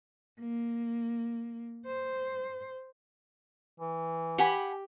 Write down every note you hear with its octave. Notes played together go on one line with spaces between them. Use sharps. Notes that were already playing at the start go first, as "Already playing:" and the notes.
A#3
C5
E3
G4 F#5 G#5 B5